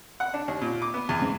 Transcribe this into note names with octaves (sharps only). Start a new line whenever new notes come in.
F#5
D4
D#2
A#2
D6
B3
E2
G#2